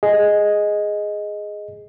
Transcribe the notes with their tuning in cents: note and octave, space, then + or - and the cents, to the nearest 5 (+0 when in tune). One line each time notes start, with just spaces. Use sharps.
G#4 +0 D#5 +0